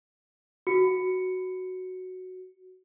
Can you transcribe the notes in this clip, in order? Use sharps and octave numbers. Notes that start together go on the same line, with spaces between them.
F#4 C#7